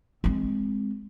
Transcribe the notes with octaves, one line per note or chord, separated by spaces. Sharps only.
G#3 C4